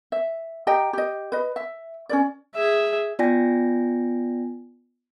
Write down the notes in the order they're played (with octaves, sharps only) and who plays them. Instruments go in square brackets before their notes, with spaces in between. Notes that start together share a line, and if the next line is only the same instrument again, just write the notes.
[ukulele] E5
G4 D#5 G5 A#5
G4 D#5
B4 D#5
E5
C#4 A#4 D5
[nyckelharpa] G#4 E5
[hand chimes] B3 F4 D5 G5 G#5 A#6